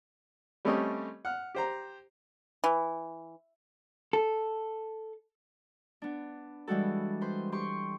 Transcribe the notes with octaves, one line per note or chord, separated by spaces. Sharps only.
G3 A3 C4 C#4 G4 D#5
F#5 F6
G4 C5 A#5
E3
A4
B3 D4
E3 G3 G#3 F#4 A4
B4 C5 C6
G4 C6 C#6